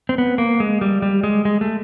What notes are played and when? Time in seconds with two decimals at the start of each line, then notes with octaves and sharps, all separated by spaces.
0.09 C4
0.18 B3
0.38 A#3
0.60 G#3
0.81 G3
1.02 G3
1.24 G#3
1.45 G#3
1.61 A3